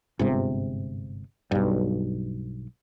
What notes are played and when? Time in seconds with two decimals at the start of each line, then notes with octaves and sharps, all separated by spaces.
0.19 G1 G#2 C3
1.51 B1 G2